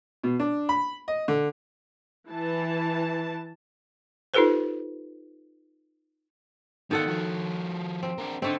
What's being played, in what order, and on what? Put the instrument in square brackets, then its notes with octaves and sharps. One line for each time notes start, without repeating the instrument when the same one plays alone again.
[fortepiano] B2
D4
B5
D#5
D3
[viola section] E3 A5
[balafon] D#4 F4 G4 A4 B4 C5
[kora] D#3 A4 F#5 [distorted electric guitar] B3 F4
[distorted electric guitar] F3 F#4
[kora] C4
[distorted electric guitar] D4 A#4
[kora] D3 A3 C4 [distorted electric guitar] D#4